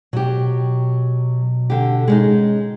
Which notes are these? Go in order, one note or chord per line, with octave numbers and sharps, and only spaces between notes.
B2 F#3 G4
D3 G4
G#3 C#4 D#4